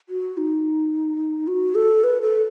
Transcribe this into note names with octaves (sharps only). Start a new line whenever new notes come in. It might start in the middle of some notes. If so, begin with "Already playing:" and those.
F#4
D#4
F#4
A4
B4
A4